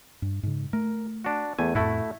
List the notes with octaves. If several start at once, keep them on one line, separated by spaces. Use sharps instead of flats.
G2
G#2 C#3
A3 A#4
D4 F#4
E2 A3 B3 G#5
F2 A2 A3 E4 F#4